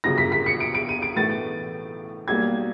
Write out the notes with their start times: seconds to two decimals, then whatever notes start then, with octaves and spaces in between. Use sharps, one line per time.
0.04 G1 F#2 C#3 F3 A#6
0.18 B6
0.32 B6
0.46 C#7
0.60 D7
0.74 D7
0.89 D#7
1.02 D7
1.16 B1 A2 E3 A3 A6
2.28 B1 B2 G3 A#3 G#6